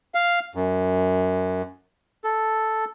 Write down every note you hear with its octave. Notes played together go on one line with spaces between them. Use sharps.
F5
F#2
A4